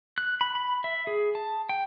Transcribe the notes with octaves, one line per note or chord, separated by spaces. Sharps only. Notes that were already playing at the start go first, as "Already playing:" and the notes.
F#6
B5
B5
E5
G#4
A5
G5